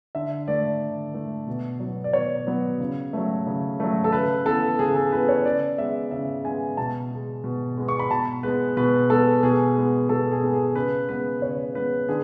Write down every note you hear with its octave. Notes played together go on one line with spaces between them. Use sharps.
D3 E5
A3 D5
D3
A3
B2
F#3 B3
D5
B2 C#5
F#3 B3
C#3
F#3 A3
C#3
F#3 A3
A4
C#3 B4
E3 B3 A4
C#3 G#4
A4
E3 B3 B4
C#5
C#3 D5
G#3 B3 E5
C#3 E5
G#3 B3 G#5
B2 A5
G#3 B3
B2
G#3 B3
C#6
B5
B2 A5
G#3 B3 B4
B2 B4
G#3 B3 A4
B2 G#4
G#3 B3
B2 A4
G#4
G#3 B3
G#4
C#3 B4
G#3 B3 B4
C#3 C#5
G#3 B3 B4
D3 G#4